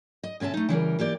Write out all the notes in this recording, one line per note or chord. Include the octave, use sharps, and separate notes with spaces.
D#5
D2 B2 C#4 E5 A5
A3 D#4
C#3 E3 G3 A#4
E3 A#3 G4 D5